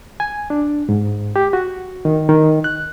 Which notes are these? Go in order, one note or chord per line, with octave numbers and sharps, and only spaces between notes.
G#5
D4
G#2
G4
F#4
D#3
D#3
F#6